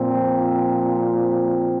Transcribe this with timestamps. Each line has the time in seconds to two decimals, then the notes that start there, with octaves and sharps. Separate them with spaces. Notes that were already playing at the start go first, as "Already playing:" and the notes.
Already playing: A#2 F3 C4
1.11 C4